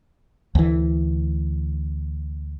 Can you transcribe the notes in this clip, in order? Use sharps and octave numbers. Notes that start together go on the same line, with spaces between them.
D2 E3